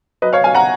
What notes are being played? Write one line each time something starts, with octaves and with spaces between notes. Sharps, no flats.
F#3 B4 D#5
C#5 F5
F#3 F5 G#5
F#5 A#5